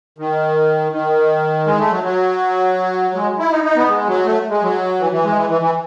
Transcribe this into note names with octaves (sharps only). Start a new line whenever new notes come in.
D#3
D#3
G#3
A3
F#3
F#3
G#3
E4
D#4
D#4
B3
G#3
F#3
A3
G#3
F#3
E3
E3
G#3
E3
E3
E3